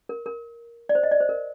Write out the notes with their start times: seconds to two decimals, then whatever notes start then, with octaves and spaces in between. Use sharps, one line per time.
0.09 A#4
0.26 A#4
0.89 D5
0.95 C5
1.03 D#5
1.11 D5
1.20 C5
1.29 A#4